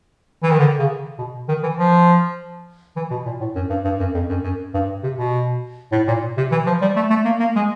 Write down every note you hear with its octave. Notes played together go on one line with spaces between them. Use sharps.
E3
D#3
D3
C#3
B2
D#3
E3
F3
E3
B2
A#2
A2
F#2
G2
G2
F#2
F2
F#2
F#2
G2
C3
B2
A2
A#2
C3
E3
F3
G3
A3
A3
A#3
A#3
G#3